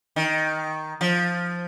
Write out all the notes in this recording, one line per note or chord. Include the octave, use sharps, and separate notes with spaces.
D#3
F3